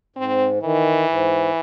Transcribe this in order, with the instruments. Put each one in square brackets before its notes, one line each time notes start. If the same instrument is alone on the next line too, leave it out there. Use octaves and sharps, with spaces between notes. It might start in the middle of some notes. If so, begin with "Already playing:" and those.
[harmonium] G#2 [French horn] C4
[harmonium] D#3 [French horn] E3
[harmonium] G#2